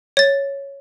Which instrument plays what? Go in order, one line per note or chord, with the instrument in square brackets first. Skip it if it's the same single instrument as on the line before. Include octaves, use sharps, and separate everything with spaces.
[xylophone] C#5 A6